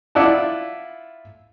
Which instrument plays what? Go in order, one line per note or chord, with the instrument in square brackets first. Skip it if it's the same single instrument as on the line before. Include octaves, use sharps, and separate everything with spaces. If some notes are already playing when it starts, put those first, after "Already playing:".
[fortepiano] E4 F4 D5 F#5 A5